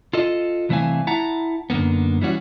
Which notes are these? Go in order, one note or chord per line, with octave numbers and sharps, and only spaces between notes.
F4 A4 D#5
C2 E3 A3 C4 F5 G#5
E4 F#5 A5 A#5
F#2 D3 A#3 B3
E3 G3 C#4 F#4